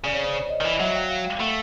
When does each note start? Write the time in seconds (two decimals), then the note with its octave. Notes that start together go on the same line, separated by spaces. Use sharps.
0.04 C#3 D5
0.13 C#5
0.22 C5 D5
0.43 D5
0.49 C#5 D#5
0.60 D#3
0.64 E3
0.80 F#3 E5 F#5
0.95 F5 G5
1.09 F5 G5
1.25 F5 G5
1.40 A3 E5 F#5